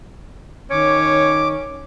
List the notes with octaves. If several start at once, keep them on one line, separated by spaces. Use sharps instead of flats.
D#3 C#4 C#5 D6